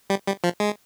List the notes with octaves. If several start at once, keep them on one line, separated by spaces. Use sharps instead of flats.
G3
G3
F3
G#3